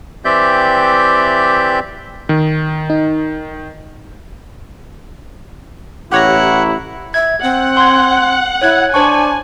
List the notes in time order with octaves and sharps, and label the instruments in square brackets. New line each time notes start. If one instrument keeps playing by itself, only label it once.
[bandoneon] E3 C4 G4 D5 E5 G6
[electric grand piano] D#3
[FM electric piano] D#4
[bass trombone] A1 [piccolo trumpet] E4 [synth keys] G4 C#5 A#5 [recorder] F#5
[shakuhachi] E5 [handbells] G#6
[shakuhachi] C4 [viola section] F#5
[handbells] C6 G#6
[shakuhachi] E4 [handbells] C#5 F#6 G#6
[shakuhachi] D4 [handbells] C5 A5 C#6 [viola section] G#5